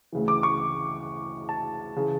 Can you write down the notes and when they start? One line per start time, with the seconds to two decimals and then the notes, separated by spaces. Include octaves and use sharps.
0.12 D2 C#3 E3
0.28 D6
0.43 C#6
1.49 A5
1.96 C#3 E3